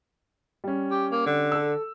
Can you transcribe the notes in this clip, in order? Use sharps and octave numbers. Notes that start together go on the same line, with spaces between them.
G3 C#4
G4
A#3
D3
A4 E6